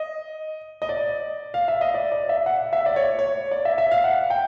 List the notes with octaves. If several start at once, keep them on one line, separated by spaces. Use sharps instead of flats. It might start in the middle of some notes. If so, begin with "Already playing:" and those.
Already playing: D#5
D#5
D5
F5
E5
D#5
D5
D5
E5
F#5
E5
D5
C#5
C#5
D5
E5
E5
F5
F#5
G5